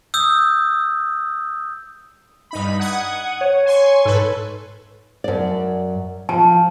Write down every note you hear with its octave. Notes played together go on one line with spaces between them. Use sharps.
D#6 E6 G6
G2 D#4 B5
F#5 D#6 G#6
C#5
G#5 C6 C#6
G#2 A4 B4
F#2 D5
F3 A5